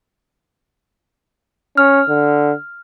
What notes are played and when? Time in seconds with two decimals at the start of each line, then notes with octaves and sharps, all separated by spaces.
1.77 C#4 F6
2.09 D3